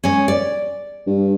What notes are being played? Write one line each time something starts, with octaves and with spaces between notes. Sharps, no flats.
G#3 C#4
D5
G2